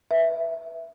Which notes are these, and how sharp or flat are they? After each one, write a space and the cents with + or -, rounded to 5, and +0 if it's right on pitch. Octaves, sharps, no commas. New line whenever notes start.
B4 +0 E5 +0